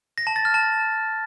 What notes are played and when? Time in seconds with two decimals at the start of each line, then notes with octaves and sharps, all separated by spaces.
0.18 A#6
0.27 A5
0.36 A6
0.45 F6
0.54 A5